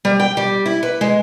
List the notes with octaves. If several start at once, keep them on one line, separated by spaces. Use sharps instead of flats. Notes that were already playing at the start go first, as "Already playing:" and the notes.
G3
G5
G3
E4
B4
G#3